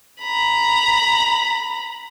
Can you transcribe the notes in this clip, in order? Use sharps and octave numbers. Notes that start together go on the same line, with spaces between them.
A#5 B5